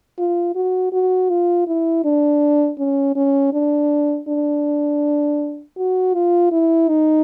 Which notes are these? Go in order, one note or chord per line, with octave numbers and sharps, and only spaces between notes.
F4
F#4
F#4
F4
E4
D4
C#4
C#4
D4
D4
F#4
F4
E4
D#4